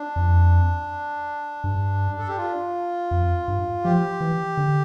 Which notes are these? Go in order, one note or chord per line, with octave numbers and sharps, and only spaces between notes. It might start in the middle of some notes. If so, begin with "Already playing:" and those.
Already playing: D4
F2
G2
A4
G4
F4
F2
G2
F3 G4
E3
D3